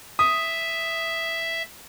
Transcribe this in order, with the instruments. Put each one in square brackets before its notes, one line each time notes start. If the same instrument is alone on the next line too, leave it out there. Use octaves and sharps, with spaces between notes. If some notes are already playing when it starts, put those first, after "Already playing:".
[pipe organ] E5 [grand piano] D#6